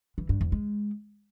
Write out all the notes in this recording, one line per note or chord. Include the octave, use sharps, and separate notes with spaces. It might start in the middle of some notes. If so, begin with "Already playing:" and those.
E3
G2
E2
G#3